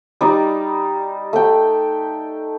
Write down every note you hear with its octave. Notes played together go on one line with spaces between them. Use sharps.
G3 D#4 D5
A3 G5